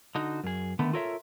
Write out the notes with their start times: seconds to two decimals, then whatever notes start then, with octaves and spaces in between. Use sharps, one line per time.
0.15 D3 D#4 F#4
0.44 F#2 G#4
0.79 D3 D#3 A3 B3
0.93 F4 A4 A#4 C#5 D5 E5